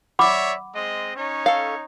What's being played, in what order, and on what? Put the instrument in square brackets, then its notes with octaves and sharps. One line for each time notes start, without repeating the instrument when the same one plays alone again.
[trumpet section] C#5 D5 E5 [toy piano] F#5 B5 D6
[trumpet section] G#3 C4 D#5
C#4 D#4 C#5
[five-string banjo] A4 F5